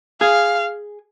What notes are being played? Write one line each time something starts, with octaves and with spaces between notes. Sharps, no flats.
G#4 F5